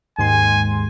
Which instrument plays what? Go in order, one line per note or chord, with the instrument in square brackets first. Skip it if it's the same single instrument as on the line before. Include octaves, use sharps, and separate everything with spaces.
[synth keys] D#2 G#2 C6 [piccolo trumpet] G#5